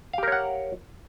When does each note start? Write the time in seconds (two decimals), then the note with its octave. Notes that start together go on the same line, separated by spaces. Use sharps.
0.13 F5
0.18 G4
0.23 A#4
0.28 C#5
0.32 F#5